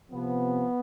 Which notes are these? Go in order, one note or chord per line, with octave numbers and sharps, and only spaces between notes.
C3 F3 B3